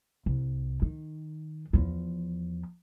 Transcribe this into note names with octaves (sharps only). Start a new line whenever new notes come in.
C2
D#3
E2 F3